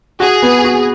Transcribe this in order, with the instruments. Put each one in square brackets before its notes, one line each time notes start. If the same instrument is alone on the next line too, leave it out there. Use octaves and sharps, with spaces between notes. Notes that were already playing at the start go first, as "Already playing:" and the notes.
[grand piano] F#4 [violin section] G#4
[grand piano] B3
F#4